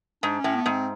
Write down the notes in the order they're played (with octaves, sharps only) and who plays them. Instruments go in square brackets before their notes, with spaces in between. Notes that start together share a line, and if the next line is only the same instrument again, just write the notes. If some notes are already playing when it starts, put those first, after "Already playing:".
[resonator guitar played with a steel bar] G#2 [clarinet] D4
[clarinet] C#4
[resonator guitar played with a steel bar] A2
[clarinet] B3
[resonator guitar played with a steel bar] G#2
[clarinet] C4